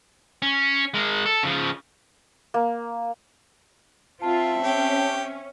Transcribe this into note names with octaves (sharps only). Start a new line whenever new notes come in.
C#4
G#3 A#4
A4
C#3 F3
A#3
C4 F4 E5 A5
C#4 G4